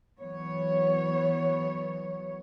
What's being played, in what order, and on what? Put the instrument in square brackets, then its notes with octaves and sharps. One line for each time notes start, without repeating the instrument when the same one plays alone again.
[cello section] E3 F#3 B3 C#5